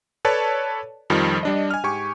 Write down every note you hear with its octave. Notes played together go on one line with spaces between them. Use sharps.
A4 B4 C#5 D5 A5
F2 D#3 F3 G3
G3 D4 D#5
G#5 F6
G#2 G4 G#5 C#6